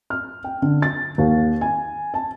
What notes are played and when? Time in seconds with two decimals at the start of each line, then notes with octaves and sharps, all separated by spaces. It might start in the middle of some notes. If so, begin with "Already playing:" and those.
0.10 F6
0.44 G5
0.62 D3
0.82 A6
1.18 D#2
1.61 G#5
2.14 A5